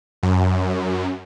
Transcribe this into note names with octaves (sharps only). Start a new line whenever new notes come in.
F#2